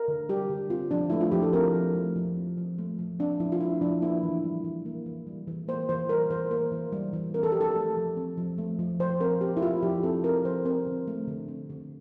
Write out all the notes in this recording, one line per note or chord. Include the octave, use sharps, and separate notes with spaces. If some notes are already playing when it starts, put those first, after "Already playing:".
Already playing: A#4
D3
G3 G4
D3
C4 F4
F3 D4
A3 E4
F4
F3 G4
A4
C4 A#4
F3
A3
F3
C4
F3
A3
F3
C4 D4
F3 E4
F4
A3 E4
F3 D4
A#3 E4
E3
G3
E3
A#3
E3
G3
E3
A#3 C5
E3 C5
G3 A#4
E3 C5
A#3 A#4
E3
G3
E3
C4 A#4
A4
F3 G4
A4
A3
F3
C4
F3
A3
F3
F3 C5
C4 A#4
C4 G4
E4
F3 F4
F3 G4
C4 A4
C4 A#4
F3 C5
C4 A#4
D3
A3
D3
C4
D3